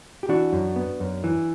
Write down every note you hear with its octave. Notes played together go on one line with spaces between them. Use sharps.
G4
E3 D4 F#4
F#2
B3
F#2
E3